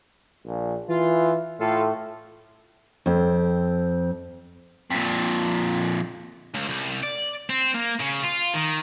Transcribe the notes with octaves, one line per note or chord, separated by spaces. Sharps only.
A#1
E3 F4
A2 F4 A4 F5
F2 C4
F2 A#2
C#2
C2
D5
C4
A#3
C#3
F4
D#3